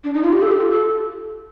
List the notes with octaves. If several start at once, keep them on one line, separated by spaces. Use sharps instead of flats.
D4
D#4
F4
G4
A4
G4
F4
A4